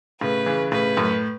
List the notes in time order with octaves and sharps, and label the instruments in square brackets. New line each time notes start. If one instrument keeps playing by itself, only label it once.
[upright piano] A2 C#3 [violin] B4
[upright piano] C#3 E3
[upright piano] A2 C#3 [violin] B4
[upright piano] F#2 A2